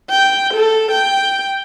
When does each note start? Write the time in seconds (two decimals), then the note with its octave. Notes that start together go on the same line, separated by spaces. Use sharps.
0.10 G5
0.54 A4
0.91 G5